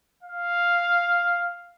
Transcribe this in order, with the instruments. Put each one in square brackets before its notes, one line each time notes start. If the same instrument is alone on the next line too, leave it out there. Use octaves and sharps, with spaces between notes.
[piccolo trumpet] F5